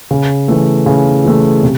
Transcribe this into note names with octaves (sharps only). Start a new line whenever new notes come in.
C#3
E3 A3
C#3
E3 A3
C3